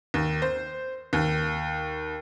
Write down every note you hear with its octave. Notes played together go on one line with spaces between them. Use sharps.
D#2
C5
D#2